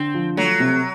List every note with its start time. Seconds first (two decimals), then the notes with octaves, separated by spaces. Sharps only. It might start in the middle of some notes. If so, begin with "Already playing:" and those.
Already playing: D3 C4
0.14 F3
0.37 F#3 A3
0.60 C3